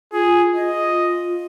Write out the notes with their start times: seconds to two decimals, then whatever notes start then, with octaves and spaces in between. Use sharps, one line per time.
0.13 F4 G#4
0.55 F4 D#5